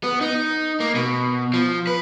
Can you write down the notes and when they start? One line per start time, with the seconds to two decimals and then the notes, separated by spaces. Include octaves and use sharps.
0.04 B3
0.21 D#4
0.80 A#3
0.95 B2
1.54 F3
1.87 B4